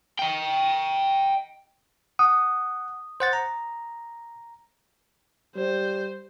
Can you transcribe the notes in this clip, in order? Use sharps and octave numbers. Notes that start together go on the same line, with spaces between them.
D#5 G5
F#5 D#6
C5 F#5 A6
A#5
G3 C5